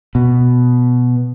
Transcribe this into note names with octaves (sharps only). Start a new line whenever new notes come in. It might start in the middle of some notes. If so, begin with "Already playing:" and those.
B2